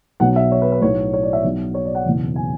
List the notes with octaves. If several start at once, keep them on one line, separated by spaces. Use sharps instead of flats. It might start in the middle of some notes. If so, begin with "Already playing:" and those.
B1 B2 F#3 F#5
E5
C#5
B4
B4
B1 A2 F#3 C#5
C#5
D5
E5
B1 B2 F#3
C#5
D5
F#5
F#1 E2 B2 F#3
G#5